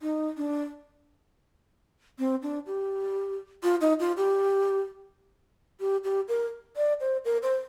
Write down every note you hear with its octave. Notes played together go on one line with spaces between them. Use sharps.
D#4
D4
C4
D4
G4
F4
D#4
F4
G4
G4
G4
A#4
D5
C5
A#4
C5